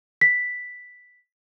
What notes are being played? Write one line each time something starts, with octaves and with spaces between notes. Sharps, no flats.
B6